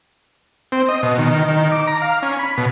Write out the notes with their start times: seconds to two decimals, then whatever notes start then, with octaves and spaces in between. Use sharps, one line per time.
0.72 C4
0.88 D#5
1.03 B2
1.18 D#3
1.31 D#3
1.48 D#3
1.72 D6
1.87 A#5
2.02 F5
2.23 C#4
2.39 B5
2.58 B2